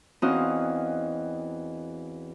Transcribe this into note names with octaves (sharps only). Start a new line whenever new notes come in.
E2 C4 C#4 F#4 D#5 F5